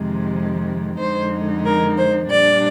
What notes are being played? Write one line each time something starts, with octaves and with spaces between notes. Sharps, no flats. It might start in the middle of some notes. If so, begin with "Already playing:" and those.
Already playing: F2 C3 D#3 G#3
F2 D3 G#3 D#4 C5
A#4
C5
A#2 G3 D4 D5